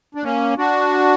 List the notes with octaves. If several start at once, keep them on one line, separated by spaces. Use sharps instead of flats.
D4
A#3 C#4
D4 F#4